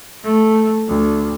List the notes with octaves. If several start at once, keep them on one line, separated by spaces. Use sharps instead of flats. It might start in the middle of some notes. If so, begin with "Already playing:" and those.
A3
D2